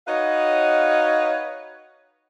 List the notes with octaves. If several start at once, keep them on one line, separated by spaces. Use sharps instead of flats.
D#4 F#4 B4 C#5 D#5 F5